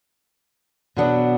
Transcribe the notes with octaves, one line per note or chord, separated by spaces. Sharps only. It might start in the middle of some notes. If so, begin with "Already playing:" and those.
B2 F#3 B3 D4